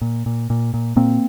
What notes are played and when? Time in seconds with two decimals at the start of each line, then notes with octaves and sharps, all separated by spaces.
0.01 A#2
0.26 A#2
0.50 A#2
0.74 A#2
0.96 A#2 A#3 C4